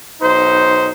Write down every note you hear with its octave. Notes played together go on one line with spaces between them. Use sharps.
B1 D#4 C5